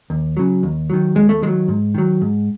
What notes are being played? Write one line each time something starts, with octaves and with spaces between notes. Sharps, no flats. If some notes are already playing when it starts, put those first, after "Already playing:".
D#2
C#3 F#3
D#2
D#3 F#3
D#2 G#3
A3
D#3 F#3 G#3
G#2
D#3 F#3
G#2